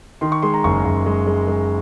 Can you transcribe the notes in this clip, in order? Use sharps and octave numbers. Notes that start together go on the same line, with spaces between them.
D#3 C6
C#6
G#3 C6
A#5
F#1 C#6
F#1
G#3
G#3
G#3